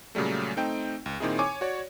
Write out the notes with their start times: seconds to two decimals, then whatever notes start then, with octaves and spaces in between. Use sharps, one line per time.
0.15 A#2 C#3 F#3 G3 A3
0.57 A3 C4 D#4 G5
1.06 C#2
1.20 A#2 D#3 C4 D#4 E4 G#4
1.39 C#5 G#5 C#6 D6
1.61 F#4 C#5 D5